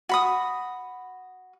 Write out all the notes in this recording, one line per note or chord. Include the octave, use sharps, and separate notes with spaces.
F#4 B5 D#6